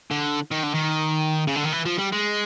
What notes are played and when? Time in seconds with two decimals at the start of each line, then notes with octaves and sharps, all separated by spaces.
0.11 D3
0.51 D#3
0.63 D3
0.74 D#3
1.47 C#3
1.56 D3
1.64 D#3
1.72 E3
1.85 F3
1.98 G3
2.12 G#3